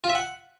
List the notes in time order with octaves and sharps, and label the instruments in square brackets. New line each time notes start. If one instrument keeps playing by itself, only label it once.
[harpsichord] F4
E5
F#5